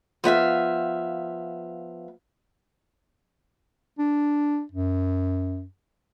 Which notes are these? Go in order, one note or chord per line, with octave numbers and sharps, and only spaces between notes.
F3 B3 E5 F5
D4
F#2